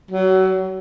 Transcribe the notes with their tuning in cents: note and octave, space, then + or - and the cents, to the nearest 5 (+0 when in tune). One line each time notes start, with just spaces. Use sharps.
F#3 +30